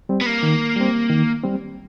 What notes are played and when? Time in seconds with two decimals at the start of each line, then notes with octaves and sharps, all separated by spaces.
0.09 G3 C4
0.21 B3
0.26 A#3
0.43 D#3
0.76 G3 C4
1.10 D#3
1.44 G3 C4